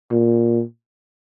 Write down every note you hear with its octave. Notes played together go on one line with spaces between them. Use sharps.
A#2